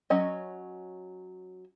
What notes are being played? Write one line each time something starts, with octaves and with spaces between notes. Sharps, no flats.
F#3 C#4 D#5